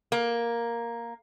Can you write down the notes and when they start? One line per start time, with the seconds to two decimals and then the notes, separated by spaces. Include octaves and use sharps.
0.12 A#3